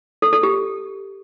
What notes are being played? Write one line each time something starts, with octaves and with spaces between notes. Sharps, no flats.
A4
A4
G4